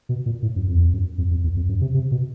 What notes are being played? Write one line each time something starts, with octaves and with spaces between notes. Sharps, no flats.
B2
A#2
A2
F#2
F2
E2
F2
F#2
F2
F2
E2
F2
F#2
C3
C3
B2